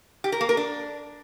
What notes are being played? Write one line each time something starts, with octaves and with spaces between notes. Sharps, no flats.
G4
A#4
A#3
A#4
D4